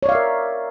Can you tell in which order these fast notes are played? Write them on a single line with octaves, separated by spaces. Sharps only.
C#5 D5 F5 E5 A#4